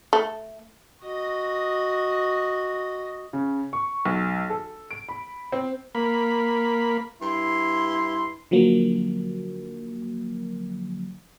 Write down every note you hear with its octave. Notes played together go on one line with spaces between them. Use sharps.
A3
F#4 D#5
C#3
C#6
B1
A4
D7
B5
C4
A#3 B5
G2 E4 C6
D3 F3 F#3 A#3